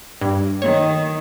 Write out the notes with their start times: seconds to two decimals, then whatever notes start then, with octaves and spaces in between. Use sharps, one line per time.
0.21 G2
0.62 D#3 C#5